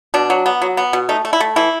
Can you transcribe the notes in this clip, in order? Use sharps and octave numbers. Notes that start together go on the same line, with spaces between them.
B2 D4
F#3
B3
F#3
B3
B2
A3 D#4
A3
E4
A3
E3 E4